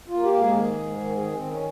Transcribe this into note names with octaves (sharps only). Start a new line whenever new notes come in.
F4
A#3
G4
G#2
G#4
D#3 G#4
G#2
D#3
D#3 G#4
C4
D#3
C#4